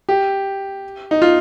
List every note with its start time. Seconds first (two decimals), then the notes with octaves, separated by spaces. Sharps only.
0.09 G4
1.11 D#4
1.22 F4